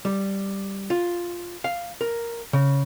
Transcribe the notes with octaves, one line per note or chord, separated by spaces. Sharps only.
G3
F4
F5
A#4
C#3